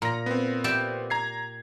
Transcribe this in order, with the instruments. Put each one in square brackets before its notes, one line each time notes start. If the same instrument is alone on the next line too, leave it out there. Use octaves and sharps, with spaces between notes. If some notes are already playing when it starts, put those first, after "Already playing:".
[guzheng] A#2 [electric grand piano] A#5 A#6
[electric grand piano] B3 C4
[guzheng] G4 D5 E5
[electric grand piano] A#5 G#6 C7